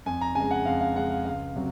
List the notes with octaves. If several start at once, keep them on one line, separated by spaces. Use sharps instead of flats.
F2 G#5
A#5
C#3 G#3 G#5
F#5
F2 F5
F5
C#3 G#3 F#5
F5
C#2 F5
C3 F#3